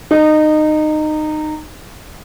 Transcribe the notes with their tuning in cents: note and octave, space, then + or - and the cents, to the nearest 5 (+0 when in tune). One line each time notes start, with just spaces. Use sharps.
D#4 -20